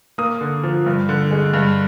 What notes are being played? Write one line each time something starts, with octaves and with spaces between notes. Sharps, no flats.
A#3 D#6
D3
F3
G2
D3
G#3
G2